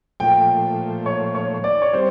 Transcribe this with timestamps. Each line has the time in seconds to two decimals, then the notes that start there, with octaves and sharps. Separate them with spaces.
0.20 A#2 F3 A3 G5
1.06 C#5
1.35 C#5
1.64 D5
1.82 C#5
1.93 G3 C4 C5